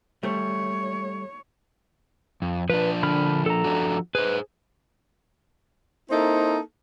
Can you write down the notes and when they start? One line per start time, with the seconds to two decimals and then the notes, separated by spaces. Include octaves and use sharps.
0.23 G3 A3 C#5
2.42 F2
2.70 F3 D4 B4
3.03 D3 B5 F6
3.46 A4 A#5
3.64 F3 D4 F#4
4.15 G#4 B4 C5
6.10 A#3 C4 D#4 E4 A4